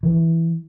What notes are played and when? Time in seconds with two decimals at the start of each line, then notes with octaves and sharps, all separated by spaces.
0.03 E3